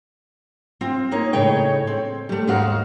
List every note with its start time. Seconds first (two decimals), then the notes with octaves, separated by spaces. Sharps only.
0.81 C4 F4
1.11 A#3 D#4 C#5
1.33 A2 C#3 G#3 C#5 G5
1.87 C4
2.29 G3 A3
2.47 D#2 G#2 G#3 F#4 F5